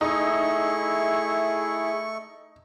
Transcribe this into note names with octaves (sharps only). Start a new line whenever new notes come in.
A3 D#4 E4 G#4 A4 C#6